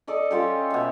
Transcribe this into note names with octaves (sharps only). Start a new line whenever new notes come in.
A4 D5 D#5
C#4 F4 G4 A4
B2 E5